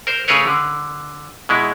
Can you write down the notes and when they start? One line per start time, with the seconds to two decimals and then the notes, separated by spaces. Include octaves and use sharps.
0.07 A#4 C5
0.28 C#3 A3 G#4 A#4 B4 C#5
0.47 D3
1.49 B2 G#3 E4